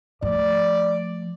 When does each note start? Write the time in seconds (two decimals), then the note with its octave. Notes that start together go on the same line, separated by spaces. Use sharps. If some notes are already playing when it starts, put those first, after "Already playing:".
0.22 F3 A3 D5